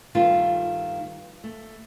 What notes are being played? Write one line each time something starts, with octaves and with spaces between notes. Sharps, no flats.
G2 D#3 A3 F4
A3